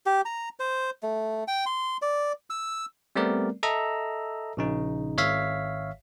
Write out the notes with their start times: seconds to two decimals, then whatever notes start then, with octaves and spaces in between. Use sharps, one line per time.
0.06 G4
0.25 A#5
0.60 C5
1.03 A3
1.48 G5
1.66 C6
2.02 D5
2.50 E6
3.15 G3 A3 B3 C4 A#4 D5
3.63 A4 D#5 E5 A#5 E6
4.57 A#1 C#3 D#4
5.17 G#1 C#5 E5 F5 B6